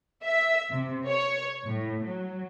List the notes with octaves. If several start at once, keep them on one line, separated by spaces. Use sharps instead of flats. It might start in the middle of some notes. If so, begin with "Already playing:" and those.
E5
C3
C#5
A2
F#3